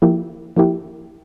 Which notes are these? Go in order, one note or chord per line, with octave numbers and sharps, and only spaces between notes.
F3 A#3 E4 G4
F3 A#3 E4 G4